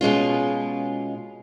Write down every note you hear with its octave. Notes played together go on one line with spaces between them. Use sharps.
B2 G#3 C#4 F4